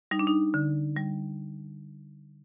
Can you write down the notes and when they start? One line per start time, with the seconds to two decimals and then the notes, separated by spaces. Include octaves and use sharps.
0.11 G3 D#4
0.19 D4
0.27 D#4
0.54 D3
0.97 G3